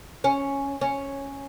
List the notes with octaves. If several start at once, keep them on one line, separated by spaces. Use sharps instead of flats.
C#4
C#4